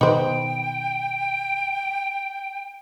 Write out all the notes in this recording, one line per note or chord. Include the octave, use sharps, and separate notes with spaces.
B2 D#3 B3 D#4 B4 C5 G5